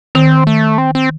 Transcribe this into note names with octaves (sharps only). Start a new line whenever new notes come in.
D#3 C4
A3
C4
C4